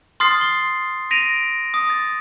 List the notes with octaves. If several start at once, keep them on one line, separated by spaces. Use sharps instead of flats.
C6 D#6 F6 A6 C7
G7
A#6 B6 D7 D#7 F7
D#6
A6